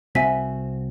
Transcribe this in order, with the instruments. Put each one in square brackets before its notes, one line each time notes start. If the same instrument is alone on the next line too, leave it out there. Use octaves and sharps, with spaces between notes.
[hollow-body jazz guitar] C2 C4 F#4 [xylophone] E5 G#5 B6